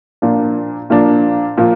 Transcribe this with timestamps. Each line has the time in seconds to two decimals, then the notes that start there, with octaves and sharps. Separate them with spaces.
0.22 A#2 F3 A#3 D4
0.90 A#2 F3 A#3 D4
1.57 A#2 F3 A#3